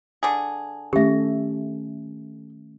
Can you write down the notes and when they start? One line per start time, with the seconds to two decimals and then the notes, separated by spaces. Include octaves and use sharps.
0.23 D3 G#4
0.93 D#3 A3 C#4 G4 E5